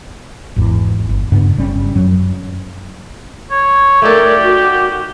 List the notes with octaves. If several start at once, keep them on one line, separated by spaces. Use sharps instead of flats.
G#1 E2
G1
G2 C#3 B3
G1 G3 C#4
F#2 F#3
C#5
A3 D#4 G4 A4 A#4 D5
F#4